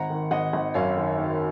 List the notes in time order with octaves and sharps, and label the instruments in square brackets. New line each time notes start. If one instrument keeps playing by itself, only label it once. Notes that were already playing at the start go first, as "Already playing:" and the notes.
Already playing: [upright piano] G#1 [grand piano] F#5 A#5
[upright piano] D#3
[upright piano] G#1 [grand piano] D#5 F#5
[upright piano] G#1
[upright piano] F#2 [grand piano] C#5 F5
[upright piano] D#3
D#3